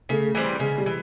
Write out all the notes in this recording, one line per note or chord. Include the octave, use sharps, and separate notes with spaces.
C#3 A3
E3 G3 C4
C#3 G#3
G3
E3